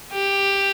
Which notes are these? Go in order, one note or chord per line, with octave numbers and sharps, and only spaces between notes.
G4